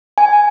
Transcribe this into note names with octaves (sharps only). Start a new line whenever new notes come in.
G#5